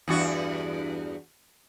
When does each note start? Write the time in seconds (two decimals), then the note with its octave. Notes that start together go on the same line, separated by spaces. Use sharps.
0.08 E2 G2 F#4